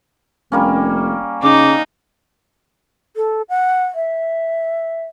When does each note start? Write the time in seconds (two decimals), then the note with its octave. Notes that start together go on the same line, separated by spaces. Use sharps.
0.52 F1 G3 A#3 C#4
1.43 C#3 D#4 D6
3.16 A4
3.49 F#5
3.95 E5